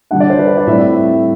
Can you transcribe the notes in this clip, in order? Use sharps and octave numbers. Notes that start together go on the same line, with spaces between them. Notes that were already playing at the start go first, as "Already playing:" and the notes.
D3 G3 D4 F#5
D5
C5
B4
C5
D5
A2 G3 C4 E5
E5